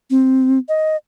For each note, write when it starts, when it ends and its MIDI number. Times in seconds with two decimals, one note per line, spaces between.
0.10 0.58 60
0.69 0.96 75